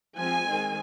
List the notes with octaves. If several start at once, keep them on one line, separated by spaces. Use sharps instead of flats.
F3 G#3 C4 G#5
D#3 G#3 C4